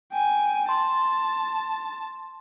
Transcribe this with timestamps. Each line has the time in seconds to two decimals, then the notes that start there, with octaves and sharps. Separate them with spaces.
0.13 G5 G#5
0.69 A5 C6